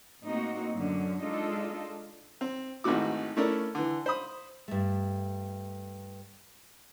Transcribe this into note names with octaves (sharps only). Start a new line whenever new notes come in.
A2 A#3 C4 D#4 F#4
F#2 D3 C#4
G#3 D4 D#4 F4 A4
C4
G#1 D#3 E3 A3 F#4 D6
A3 C#4 E4 A4 A#4 D5
D3 E3
C5 B5 D#6
G2 A3